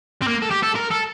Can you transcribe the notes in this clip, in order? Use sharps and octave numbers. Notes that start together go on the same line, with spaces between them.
C4
A#3
A4
G4
A4
A#4
A4